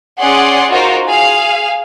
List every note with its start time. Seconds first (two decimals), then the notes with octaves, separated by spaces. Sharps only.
0.20 C#4 G#4 D5 F#5 C6
0.69 D#4 F4 F#4 A#4 C5
1.06 G#4 F5